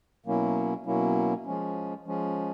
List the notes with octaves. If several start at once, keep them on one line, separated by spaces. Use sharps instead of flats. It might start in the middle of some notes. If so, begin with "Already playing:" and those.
B2 F#3 A#3 C#4 E4
B2 F#3 A#3 C#4 E4
F3 G#3 C#4
F3 G#3 C#4